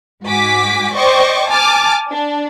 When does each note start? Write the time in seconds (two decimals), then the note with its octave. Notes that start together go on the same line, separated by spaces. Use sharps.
0.24 G#2 F#4 G#5 D6 B6
0.94 C5 D5 D#5 G5 C#6 D6
1.49 G#5 A5 D6 F6 A6
2.11 D4